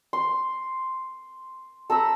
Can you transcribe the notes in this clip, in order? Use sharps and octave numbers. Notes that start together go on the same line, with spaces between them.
C6
A4 A#5 B5 E6